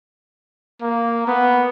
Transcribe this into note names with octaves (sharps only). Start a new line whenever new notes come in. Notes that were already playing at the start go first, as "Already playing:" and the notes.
A#3
B3